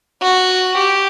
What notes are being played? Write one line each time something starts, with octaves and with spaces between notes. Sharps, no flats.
F#4
G4